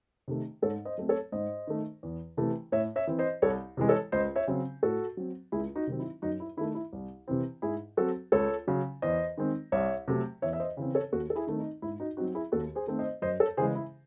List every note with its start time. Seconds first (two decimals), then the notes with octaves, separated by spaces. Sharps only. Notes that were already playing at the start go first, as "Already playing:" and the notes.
0.28 C3 D#3 A3
0.62 G#2 A4 C#5
0.85 C5 D#5
0.98 F#3 A3 C4
1.09 A4 C#5
1.32 G#2 C5 D#5
1.67 D#3 A3
2.03 E2
2.37 C3 E3 A3
2.72 A2 C#5 E5
2.96 C#5 E5
3.07 E3 C4
3.19 C5 D#5
3.42 C2 A4 C#5
3.77 C3 E3 G#3
3.89 A4 C#5
4.12 C#2 C5 D#5
4.36 C#5 E5
4.47 C#3 F#3 C4
4.83 A2 F#4 A4
5.17 F#3 C4
5.52 C#2 E4 G#4
5.76 D#4 F#4
5.87 C3 D#3 F#3 C4
5.99 E4
6.22 F#2 D#4 F#4
6.40 E4
6.57 D#3 E4
6.61 A3
6.75 E4
6.93 C2
7.28 C3 E3 C4
7.62 G#2 E4 G#4
7.97 F#3 C4 F#4 A4
8.32 C#2 A4 C#5
8.67 C#3 F#3
9.02 E2 C5 D#5
9.37 D#3 G#3 C4
9.72 C2 C#5 E5
10.08 C3 F#3 A3
10.42 E2 C#5 E5
10.53 E5
10.60 C5 D#5
10.77 C#3 E3 C4
10.95 A4 C#5
11.12 D#2 F#4 A4
11.30 A4
11.36 E4 G#4
11.47 D#3 A3 C4
11.59 D#4
11.82 G#2 E4
12.00 D#4 F#4
12.17 C4 D#4 F#4
12.21 F#3
12.35 E4 G#4
12.52 D#2 F#4 A4
12.75 G#4 C5
12.87 D#3 A3 C4
12.99 C5 D#5
13.22 F#2 C5 D#5
13.40 A4 C#5
13.57 C#3 E3 G#3 G#4 C5
13.75 E4